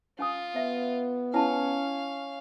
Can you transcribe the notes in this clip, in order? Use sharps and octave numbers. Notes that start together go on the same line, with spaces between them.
C#4 F4 G#5 D#6
B3 E5
C#4 E4 F5 A5